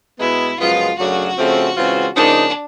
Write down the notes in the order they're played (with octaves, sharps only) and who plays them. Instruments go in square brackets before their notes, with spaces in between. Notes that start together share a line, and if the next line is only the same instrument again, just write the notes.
[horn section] B2 G#3 B3 [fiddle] E4
[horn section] F#2 C#3 F3 G#3 B3 [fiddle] F4
[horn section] F#2 C#3 F#3 A3 D4 [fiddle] F#4
[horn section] C#3 F3 A3 C4
C#3 E3 G#3 C4 F4
[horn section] C#3 F3 A#3 D#4 [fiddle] D4